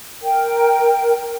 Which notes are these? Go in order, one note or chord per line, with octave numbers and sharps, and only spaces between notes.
A#4 G5